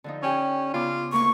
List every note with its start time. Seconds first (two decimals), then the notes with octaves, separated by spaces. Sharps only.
0.04 D3 F3 D#4
0.23 C#4 G4 G5 G#5
0.74 C#3 B3 F4 D6
1.13 D2 A#3 C6 C#6